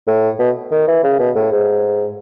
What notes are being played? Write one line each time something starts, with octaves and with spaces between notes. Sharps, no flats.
A2
B2
D#3
E3
C#3
B2
A2
G#2